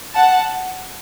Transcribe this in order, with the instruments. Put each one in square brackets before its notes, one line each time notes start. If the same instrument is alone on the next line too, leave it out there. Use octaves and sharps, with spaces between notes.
[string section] F#5 A5